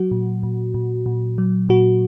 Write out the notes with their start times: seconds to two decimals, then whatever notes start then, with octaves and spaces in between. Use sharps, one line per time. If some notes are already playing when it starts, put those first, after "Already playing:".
Already playing: F#3 F#4
0.11 A#2
0.43 A#2
0.74 A#2
1.06 A#2
1.38 F#3
1.69 A#2 F#4